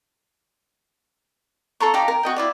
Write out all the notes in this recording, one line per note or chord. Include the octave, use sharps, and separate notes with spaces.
F4 A4 A#5 C#6
D#4 G4 F5 A#5
A#4
F#4 D#5 G5
E4 F4 D5